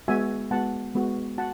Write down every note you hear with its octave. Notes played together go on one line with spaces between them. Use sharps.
G#3 B3 F#4 E5 G#5
G#3 B3 F#4 F#5 A5
G#3 B3 F#4
F#4 F#5 A5